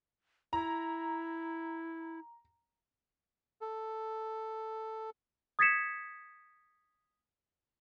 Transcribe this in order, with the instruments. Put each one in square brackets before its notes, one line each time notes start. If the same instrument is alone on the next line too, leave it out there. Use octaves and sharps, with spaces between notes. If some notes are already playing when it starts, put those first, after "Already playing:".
[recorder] E4 [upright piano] A#5
[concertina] A4
[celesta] D#6 G#6 A6 B6 C#7 E7